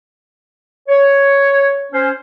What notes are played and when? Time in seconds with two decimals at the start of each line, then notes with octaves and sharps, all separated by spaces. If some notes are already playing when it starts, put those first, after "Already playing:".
0.88 C#5
1.93 C#4 C5